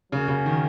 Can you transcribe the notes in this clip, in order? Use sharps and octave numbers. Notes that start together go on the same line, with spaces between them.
C#3 F#3 A#3 C#4
C#3
D#3